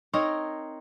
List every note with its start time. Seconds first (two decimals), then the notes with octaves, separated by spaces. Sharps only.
0.14 C4 D#4 A#4 C#5